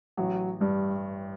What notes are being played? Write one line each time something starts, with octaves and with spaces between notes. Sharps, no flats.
A1 F#3
G2 G3